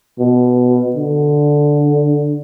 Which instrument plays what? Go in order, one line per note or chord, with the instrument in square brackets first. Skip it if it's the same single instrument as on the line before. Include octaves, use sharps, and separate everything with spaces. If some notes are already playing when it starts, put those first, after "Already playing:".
[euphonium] B2
D3